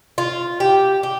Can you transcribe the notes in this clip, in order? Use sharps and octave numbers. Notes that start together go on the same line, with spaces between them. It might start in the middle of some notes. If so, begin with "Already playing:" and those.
F4
G4
G4